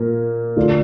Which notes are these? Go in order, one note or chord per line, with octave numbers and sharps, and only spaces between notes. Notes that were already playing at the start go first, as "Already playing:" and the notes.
Already playing: A#2 A#3
D3 A3 D4 F4